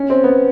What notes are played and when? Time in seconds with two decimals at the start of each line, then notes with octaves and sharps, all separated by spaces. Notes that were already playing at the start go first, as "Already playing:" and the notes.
Already playing: C#4
0.10 C4
0.24 B3